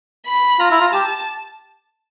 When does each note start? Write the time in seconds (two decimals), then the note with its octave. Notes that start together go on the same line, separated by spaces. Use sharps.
0.27 B5
0.60 F4 A#5
0.71 E4
0.81 F4
0.93 G4 A5